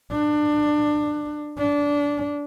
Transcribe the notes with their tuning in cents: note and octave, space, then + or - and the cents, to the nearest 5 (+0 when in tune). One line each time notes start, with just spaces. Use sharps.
D4 +20
D4 -20